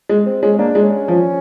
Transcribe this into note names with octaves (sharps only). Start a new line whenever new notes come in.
G#3
C4
G#3 C#4
A#3 D4
G#3
C#4
F3